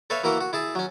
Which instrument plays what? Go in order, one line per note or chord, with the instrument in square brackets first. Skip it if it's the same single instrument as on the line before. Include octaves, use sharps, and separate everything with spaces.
[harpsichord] A4 B4 C#5 E5 F5
E3 A#3 E4 F#4 A#4
F#4
E4 G#4 A5
F#3 C#4